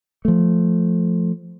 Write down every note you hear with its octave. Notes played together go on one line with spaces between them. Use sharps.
F3 A3